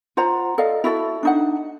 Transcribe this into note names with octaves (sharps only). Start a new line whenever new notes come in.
F4 C5 F#5 A#5
A4 D5 D#5 F5
E4 F#4 A4
D4 D#4 F#5